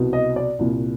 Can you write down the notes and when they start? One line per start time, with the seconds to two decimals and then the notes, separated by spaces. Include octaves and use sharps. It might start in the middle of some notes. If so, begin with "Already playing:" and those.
Already playing: C2 B2
0.13 D#5
0.36 D5
0.59 C2 A#2